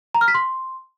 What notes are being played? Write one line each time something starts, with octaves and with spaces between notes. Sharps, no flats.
A#5
F6
B6
C6